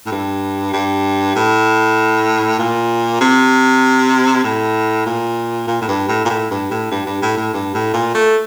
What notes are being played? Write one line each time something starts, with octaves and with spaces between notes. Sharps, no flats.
A2
G2
G2
A2
A#2
C3
A2
A#2
A#2
A2
G2
A2
A#2
A2
G2
A2
G2
G2
A2
A2
G2
A2
A#2
A3